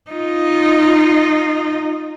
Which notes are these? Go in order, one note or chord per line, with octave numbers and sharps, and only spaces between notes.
D#4 F4